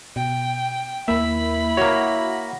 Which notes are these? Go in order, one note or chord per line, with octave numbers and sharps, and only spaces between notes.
B2 G5
D#2 A#3 E4 E5 B5
A#3 F#4 C#5 F#5 A#6